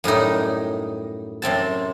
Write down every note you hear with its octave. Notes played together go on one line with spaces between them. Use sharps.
F#2 A2 G3 D#4
F#2 C3 C4 A5